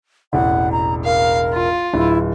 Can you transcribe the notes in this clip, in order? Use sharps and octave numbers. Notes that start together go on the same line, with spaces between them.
E1 A1 F#5
A#5
A#4 F5
F4
D1 E4